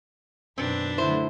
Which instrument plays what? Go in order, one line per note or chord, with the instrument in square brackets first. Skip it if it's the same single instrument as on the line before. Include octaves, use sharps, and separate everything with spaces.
[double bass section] F#2 B2 D#3 [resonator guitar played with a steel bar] C4 [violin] D4 B4
[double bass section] D3 F#3 A3 [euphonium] E4 [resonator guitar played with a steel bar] C5